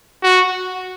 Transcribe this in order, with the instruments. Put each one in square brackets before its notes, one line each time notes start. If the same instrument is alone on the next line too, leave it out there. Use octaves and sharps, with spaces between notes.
[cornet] F#4